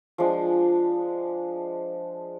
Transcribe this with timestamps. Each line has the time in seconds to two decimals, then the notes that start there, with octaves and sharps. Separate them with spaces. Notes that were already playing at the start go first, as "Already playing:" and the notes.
0.18 F3 G#3 D4